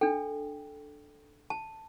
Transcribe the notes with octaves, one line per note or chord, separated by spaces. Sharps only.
D4 A4 G5
A5